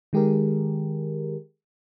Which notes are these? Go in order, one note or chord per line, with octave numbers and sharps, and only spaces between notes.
D#3 G#3 G4 G#4 A#4